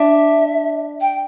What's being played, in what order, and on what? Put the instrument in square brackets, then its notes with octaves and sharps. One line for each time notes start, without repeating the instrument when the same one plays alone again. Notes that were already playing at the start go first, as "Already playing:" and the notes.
Already playing: [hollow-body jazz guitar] D4 [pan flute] E5
[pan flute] G5